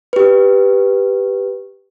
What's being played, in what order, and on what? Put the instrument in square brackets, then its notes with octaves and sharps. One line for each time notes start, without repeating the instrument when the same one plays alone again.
[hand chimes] G4 B4